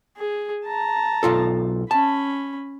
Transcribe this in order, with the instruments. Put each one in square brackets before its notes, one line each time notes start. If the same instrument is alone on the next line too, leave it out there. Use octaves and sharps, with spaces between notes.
[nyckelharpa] G#4
A5 A#5
[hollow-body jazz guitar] B1 F4 A4
[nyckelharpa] C#4 B5 [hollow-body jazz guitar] A5